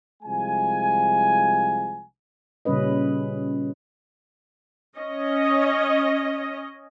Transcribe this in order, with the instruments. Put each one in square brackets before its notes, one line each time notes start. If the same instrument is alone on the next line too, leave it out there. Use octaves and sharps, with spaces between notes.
[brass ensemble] C2 F3 G#3 G#5
[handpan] A#2 C#3 G3 C#4 B4 D#5
[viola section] C#4 D#5